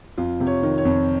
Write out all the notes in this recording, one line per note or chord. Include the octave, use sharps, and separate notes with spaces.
F2 F4
C3
C#5
D#3
C#5
F2